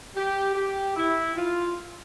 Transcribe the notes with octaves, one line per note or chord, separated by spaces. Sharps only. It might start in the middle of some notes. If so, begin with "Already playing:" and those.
G4
G4
E4
F4